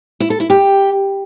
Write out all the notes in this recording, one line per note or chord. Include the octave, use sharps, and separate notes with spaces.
E4
A4
E4
G4